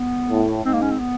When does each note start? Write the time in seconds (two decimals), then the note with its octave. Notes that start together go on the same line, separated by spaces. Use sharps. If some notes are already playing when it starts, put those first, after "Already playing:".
Already playing: B3
0.30 A2
0.65 G#2 C4
0.73 A#3
0.82 C#4
0.91 C4
0.99 B3